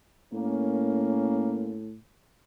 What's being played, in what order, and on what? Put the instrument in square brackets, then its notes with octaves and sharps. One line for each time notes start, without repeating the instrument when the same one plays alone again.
[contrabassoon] A2 [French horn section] A#3 C#4